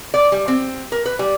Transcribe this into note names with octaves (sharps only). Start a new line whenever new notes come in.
D5
G3
C4
A#4
B4
G3